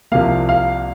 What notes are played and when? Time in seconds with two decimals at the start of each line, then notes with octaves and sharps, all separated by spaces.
0.12 C2 C3 F3 A#3 F5
0.49 F5